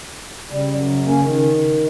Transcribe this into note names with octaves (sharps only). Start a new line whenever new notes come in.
C#3 G3
F#2 F#3
A#3 C#4
D#3